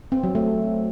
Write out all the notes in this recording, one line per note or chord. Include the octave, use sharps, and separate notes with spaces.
C4
F#3
A3